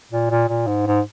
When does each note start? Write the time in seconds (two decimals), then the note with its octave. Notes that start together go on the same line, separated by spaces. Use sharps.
0.11 A#2
0.30 A#2
0.48 A#2
0.67 G#2
0.86 G#2